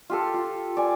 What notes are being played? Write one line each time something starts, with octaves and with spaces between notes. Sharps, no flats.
F4 G4 A4
F4
D5 G#5